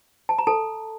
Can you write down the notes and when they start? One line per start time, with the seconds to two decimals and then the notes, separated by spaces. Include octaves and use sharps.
0.29 A5
0.39 A#5
0.47 A4 A5